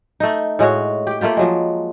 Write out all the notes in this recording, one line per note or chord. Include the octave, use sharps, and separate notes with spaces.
A3 D#4
A2 G#3 F#4 C#5
G4 G5
A3 A#3 F4 G4
F3 F#3 G#3